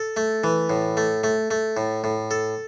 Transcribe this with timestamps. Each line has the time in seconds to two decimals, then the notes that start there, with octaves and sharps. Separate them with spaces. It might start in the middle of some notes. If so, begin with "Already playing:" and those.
Already playing: A4
0.17 A3
0.44 E3
0.70 A2
0.97 A3
1.24 A3
1.51 A3
1.77 A2
2.04 A2
2.31 A4